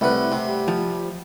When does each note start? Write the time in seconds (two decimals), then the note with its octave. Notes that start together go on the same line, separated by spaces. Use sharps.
0.01 C2 A3 E4 B4 F#5
0.32 C3
0.47 G3
0.68 F3